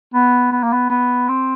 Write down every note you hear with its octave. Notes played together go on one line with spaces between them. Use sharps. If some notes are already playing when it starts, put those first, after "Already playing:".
B3
B3
A#3
B3
B3
C4